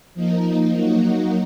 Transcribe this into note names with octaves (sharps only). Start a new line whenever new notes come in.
F3 A#3 D#4
F#3 A#3 D#4 F#4